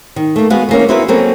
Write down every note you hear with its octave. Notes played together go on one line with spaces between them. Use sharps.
D#3
A3 A#3
G#3 B3 F#4 F5 F#5
E3 A#3 C#4
C4 E4 F#4 G#4 A#4 B4
F#3 A#3 C4 C#4 A4 A#4